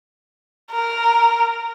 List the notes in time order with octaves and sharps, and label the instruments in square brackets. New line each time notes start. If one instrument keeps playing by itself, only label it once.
[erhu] A#4